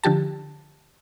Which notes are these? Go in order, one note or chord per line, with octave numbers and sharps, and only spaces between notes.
D3 F3 G4 A5